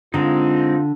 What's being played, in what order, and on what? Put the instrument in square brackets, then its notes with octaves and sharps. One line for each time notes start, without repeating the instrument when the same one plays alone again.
[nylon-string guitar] D3 [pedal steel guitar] G#3 C4 D#4 [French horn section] F4